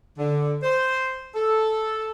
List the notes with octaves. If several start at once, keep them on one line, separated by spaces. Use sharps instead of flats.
D3
C5
A4